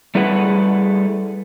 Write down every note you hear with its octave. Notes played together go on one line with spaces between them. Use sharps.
G3 A3 E4 G#4 B4 F#5